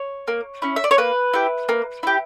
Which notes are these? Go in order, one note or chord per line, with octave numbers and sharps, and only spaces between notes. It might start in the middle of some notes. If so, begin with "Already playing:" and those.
Already playing: C#5
A#3
C#4 E4
E5
D5
C#5
A#3 B4
E4 G4
A#3
E4 G4